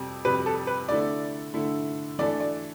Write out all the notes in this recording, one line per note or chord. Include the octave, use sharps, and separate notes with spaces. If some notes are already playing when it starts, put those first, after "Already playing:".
Already playing: F2 C3 G3
F2 C3 G3 B4
A4
B4
D3 A3 E4 D5
D3 A3 E4
E3 A3 D4 A4 D5
D5